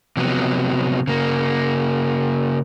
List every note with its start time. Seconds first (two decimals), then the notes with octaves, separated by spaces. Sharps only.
0.17 C3 F3 F#3 B3
1.07 C#3 A#3